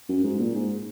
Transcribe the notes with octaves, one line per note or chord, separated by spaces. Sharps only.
F#2
G#2
A#2
G#2